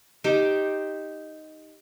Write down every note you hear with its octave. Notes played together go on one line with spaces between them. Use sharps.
D#4 G4 C5 D6